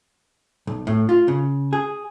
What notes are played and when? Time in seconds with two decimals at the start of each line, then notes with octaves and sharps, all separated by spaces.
0.67 B1
0.87 A2
1.09 F4
1.28 C#3
1.73 G#4